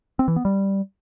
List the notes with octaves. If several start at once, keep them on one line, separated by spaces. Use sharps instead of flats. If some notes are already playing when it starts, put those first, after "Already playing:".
C4
E3
B3
G3